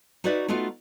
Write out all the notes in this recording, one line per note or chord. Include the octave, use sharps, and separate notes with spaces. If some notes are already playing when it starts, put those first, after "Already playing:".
D#4 F#4 B4 C#5 D5 E5
A3 B3 D#4 F4 F#4